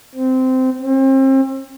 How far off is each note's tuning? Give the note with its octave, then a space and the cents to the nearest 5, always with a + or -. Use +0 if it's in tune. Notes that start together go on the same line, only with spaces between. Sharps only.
C4 -15
C4 +35